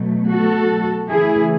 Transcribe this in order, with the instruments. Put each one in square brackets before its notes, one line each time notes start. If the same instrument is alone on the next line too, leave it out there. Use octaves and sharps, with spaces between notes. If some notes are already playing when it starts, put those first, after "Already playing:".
Already playing: [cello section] B2 F#3 A3
F#4 A4
C#3 E3 A3 E4 G#4